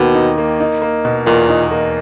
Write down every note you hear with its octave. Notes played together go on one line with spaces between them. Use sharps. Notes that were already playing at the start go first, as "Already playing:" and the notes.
Already playing: D#2 B2 D#3 A#3 D#4
D#4
A#3
D#4
A#3
B2
E2 A#2
D#4
A#3